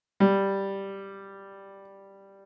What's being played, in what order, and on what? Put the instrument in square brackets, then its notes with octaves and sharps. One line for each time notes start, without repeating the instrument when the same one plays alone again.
[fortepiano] G3